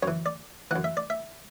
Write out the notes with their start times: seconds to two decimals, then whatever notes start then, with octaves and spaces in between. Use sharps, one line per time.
0.03 F#2 E3 C#5
0.26 D5
0.71 F#2 E3 F#5
0.84 E5
0.97 D5
1.10 E5